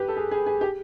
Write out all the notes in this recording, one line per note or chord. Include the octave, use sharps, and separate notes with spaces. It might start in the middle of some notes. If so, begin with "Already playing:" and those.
Already playing: G4 B4
A4
G#4
G#4
G#4
G4